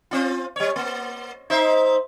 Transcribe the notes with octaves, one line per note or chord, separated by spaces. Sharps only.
C4 F4
G3 C#5
A#3
D#4 C5 E5